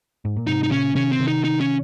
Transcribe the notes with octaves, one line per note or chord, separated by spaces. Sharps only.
G#2
A#2
G#2 C3 D#4
D#4
A#2 C#3 C#4
C3 D#3 C#4
C4
C3 D#3
D#4
D#4
C#4